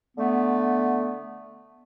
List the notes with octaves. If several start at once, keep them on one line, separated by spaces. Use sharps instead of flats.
D3 A3 B3